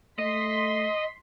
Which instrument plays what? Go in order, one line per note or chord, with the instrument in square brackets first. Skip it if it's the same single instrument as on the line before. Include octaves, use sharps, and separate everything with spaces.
[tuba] A3 [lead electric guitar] D#5 [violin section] C6 B6